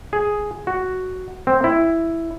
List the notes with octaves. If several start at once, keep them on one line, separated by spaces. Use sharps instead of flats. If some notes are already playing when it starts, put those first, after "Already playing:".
G#4
F#4
C4
E4